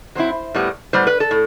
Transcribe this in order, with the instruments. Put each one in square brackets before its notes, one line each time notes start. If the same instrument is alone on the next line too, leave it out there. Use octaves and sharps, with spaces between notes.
[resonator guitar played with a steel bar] F#3 C4 E4 C5
A2 G3 B3
A2 G3 B3 C5
B4
A4
A2